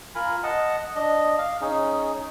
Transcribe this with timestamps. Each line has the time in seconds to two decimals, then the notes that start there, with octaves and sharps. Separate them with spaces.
0.15 F4 A#4 G#5 B5
0.43 D#5 F#5 A5
0.96 D4 D#5
1.38 F5
1.61 C#4 D#4 G#4